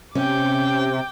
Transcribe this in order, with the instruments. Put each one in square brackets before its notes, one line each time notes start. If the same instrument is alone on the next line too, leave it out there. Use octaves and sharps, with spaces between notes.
[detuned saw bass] C3 [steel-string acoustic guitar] C#4 [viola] G5 D6